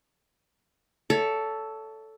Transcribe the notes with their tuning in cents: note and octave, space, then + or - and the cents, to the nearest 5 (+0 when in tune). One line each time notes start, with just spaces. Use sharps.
A4 +0 C#5 +35 E5 +0